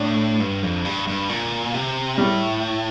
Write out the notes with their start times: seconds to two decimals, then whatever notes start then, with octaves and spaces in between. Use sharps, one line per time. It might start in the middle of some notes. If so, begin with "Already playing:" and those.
Already playing: A2 D4
0.40 G2
0.63 F2
0.85 G2
1.08 G2
1.29 A#2
1.74 C3
2.18 A2 G3